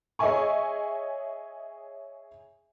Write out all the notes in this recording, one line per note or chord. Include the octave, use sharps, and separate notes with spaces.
G#4 C#5 D#5 E5 G#5 C#6